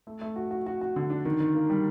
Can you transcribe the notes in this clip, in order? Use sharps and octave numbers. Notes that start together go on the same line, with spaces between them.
A3
A3
F#4
F#4
F#4
F#4
D3
D4
D#3
D#3
A#3
G3